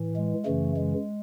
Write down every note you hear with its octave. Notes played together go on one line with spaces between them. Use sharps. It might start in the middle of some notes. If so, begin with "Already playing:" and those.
Already playing: A2 E3
G#3
F#2 C#3 E3 A3
G#3